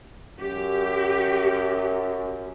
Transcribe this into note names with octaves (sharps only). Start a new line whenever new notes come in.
F#2 G4